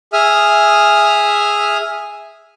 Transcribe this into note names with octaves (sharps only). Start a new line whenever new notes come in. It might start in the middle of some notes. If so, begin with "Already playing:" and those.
G#4 E5 D#6 F6